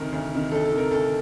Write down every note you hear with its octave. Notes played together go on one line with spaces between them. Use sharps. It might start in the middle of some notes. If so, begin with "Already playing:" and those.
Already playing: D2 C3 D#3 A#4
D2
C3 D#3
D2 A4
A4
C3 D#3
A#4
D2 A4